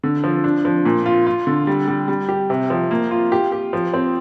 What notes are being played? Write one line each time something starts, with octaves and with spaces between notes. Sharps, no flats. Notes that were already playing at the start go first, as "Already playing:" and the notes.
D3
F3
D4
F3
A#2
F4
F4
D3
G3
G3
G3
G4
C3
F3
A#3
F4
G4
G4
F3
C4